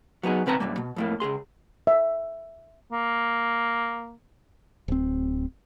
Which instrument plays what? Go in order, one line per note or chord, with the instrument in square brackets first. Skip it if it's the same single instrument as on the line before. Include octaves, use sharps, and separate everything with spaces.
[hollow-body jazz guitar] F#3 B3 D#4 G#4
D2 B2 C4 B4 A5 A#5
B1 F#2 G3 A#3
B2
F2 A2 A#3
C#2 G#2 G#4 C6
[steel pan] E5
[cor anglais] A#3
[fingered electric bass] D1 C4